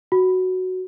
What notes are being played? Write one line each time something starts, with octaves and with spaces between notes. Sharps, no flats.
F#4